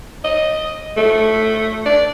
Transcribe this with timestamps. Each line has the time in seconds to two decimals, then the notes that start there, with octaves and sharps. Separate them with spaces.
0.24 D#5
0.97 A3
1.86 D5